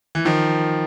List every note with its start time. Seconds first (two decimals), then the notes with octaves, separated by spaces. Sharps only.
0.15 E3
0.25 D#3 F3